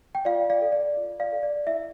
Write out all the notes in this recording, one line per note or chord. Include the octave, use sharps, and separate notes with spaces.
G5
F4 D5 F5
D5 F5
A4 D5
D5
F4
D5 F5
A4 D5
D5
E4 E5